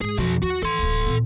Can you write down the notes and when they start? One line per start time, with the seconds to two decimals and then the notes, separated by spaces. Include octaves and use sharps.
0.02 G#2 G#4
0.18 B1 F2 F#4
0.42 D#2 F#4
0.63 D#3 A4 C6
0.79 D1 B1
1.06 A#2 C4